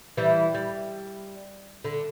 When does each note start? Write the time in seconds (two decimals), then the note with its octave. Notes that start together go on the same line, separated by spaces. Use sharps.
0.17 E3 G3
0.54 G3
1.84 D3